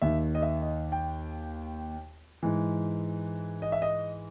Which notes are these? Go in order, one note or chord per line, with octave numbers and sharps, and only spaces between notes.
D#2 D#3 E5
D#5
E5
D#5
G5
G#2 E3
D#5
E5
D#5